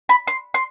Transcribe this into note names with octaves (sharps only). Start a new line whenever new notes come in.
B5
C6
C6